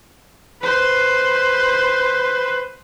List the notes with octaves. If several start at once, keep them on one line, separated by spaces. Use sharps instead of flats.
B4 C5